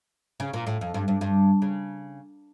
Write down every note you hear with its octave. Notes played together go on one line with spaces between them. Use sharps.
C#3
A#2
A2
F2
G2
G2
G2
C#3